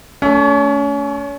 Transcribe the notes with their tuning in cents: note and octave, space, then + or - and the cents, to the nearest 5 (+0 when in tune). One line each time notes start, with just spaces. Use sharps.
A3 +0 C#4 +35